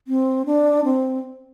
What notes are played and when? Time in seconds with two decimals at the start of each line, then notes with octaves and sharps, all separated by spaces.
0.08 C4
0.46 D4
0.84 C4